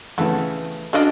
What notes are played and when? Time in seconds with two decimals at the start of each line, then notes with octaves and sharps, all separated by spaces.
0.18 C#3 E3 A3 B3
0.93 C#4 D4 F#4 A4 D5 D#5 F5